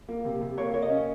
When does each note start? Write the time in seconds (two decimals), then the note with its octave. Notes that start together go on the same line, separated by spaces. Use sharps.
0.09 A#3
0.25 C3
0.41 C3
0.58 A#3 C#5
0.74 A#3 C#5
0.82 D#5
0.90 C#4